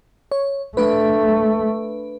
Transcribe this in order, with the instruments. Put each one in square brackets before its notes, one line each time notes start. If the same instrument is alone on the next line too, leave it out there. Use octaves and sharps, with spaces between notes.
[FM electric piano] C#5
[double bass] A3 [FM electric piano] D4 B4